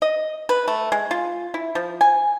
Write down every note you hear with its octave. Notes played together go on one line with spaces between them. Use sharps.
D#5
B4
A3
G#3
F4
E4
F3
G#5